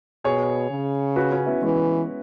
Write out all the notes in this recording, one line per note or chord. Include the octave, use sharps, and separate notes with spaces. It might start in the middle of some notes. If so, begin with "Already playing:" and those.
B2 G#4 C#5
C#3
F#4 B4
C#4 F#4
B3 E4
E3 G#3 C#4